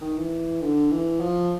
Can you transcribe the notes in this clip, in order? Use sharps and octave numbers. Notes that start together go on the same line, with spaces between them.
D#3
E3
D3
E3
F3